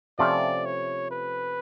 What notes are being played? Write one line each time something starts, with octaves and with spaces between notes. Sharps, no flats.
C3 F3 A3 C#4 F4 D5
C#5
B4